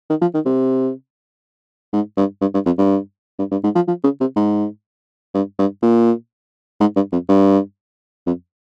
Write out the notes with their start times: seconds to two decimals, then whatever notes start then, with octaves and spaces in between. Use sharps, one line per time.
0.10 D#3
0.21 F3
0.34 D#3
0.46 C3
1.93 G#2
2.17 G2
2.41 G2
2.54 G2
2.66 F2
2.78 G2
3.39 G2
3.51 G2
3.64 G#2
3.75 F3
3.88 F3
4.04 C#3
4.21 C3
4.36 G#2
5.34 G2
5.59 G2
5.82 A#2
6.80 G#2
6.96 G2
7.12 F2
7.29 G2
8.27 F2